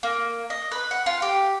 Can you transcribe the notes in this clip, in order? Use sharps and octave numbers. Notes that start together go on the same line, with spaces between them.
A#3
D#5
B4
F#5
F4
G4